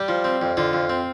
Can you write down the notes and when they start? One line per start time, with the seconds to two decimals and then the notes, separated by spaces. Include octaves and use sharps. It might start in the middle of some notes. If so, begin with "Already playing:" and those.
Already playing: G3 G4
0.08 F3
0.24 C4
0.42 F2
0.57 D3 F4
0.73 F2
0.89 C4